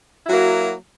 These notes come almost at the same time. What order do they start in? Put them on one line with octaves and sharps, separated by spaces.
E4 F#3 F#4 A#3